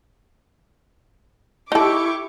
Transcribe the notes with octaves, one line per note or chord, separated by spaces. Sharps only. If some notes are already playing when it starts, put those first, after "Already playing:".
D#4 E4 G4 A4 C#6 D6